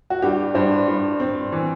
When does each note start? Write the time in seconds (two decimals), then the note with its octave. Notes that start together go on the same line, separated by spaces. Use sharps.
0.10 F#4
0.22 G2 G4
0.55 G2 C5
0.88 G2
1.20 C4
1.52 E3